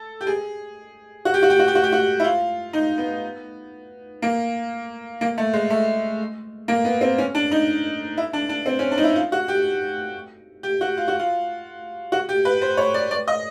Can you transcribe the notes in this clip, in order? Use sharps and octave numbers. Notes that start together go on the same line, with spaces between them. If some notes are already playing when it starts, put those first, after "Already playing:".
Already playing: A4
G4
G#4
F#4
G4
F#4
G4
F#4
G4
F#4
G4
F#4
E4
F4
D#4
B3
A#3
A#3
A3
G#3
A3
A#3
B3
C4
C#4
D4
D#4
E4
D4
D4
C4
C#4
D4
D#4
E4
F4
F#4
G4
G4
F#4
F4
F#4
F4
F#4
G4
B4
C5
C#5
D5
D5
D#5